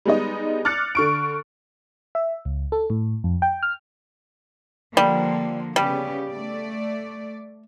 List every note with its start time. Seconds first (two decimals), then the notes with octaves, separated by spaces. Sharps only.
0.05 G3 G#3 B3 D#4 D#5
0.65 D6 F6 F#6 A6 C#7
0.95 D3 C#6 D7
2.15 E5
2.45 C#2
2.72 A4
2.90 A2
3.24 F2
3.42 G5
3.63 F6
4.97 D3 F3 G3 A#3
5.76 C#3 G3 B3 G4
6.31 A3 D5